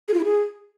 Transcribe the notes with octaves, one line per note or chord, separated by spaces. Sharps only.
G#4
F4
E4
G#4